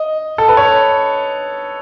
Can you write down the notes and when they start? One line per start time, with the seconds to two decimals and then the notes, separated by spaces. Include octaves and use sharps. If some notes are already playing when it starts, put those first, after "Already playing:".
Already playing: D#5
0.38 A4
0.49 B4
0.57 C#5